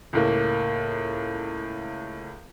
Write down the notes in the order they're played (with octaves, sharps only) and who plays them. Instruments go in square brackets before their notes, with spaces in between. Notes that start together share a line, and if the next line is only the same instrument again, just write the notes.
[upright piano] C#2 A2 A#3